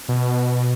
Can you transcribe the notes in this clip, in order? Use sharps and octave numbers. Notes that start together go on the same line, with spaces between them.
B2